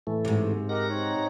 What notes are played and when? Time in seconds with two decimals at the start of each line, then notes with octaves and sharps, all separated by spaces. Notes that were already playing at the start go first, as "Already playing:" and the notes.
0.07 A2 E3 A3
0.25 G#2 C3
0.69 G4 A#4 D#5 F#5 A#6
0.89 C4 D#4 C#5